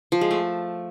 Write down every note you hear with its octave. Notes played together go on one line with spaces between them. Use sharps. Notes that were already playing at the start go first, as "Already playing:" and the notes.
F3
G#3
A3